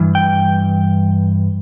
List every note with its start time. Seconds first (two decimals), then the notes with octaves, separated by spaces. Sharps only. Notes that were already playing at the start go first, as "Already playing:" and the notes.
Already playing: G2 E3
0.15 G5